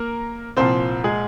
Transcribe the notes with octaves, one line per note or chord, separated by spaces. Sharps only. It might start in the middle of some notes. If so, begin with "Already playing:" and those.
Already playing: A#3 A#4
C2 A#2 F3 C4 C5
G#3 G#4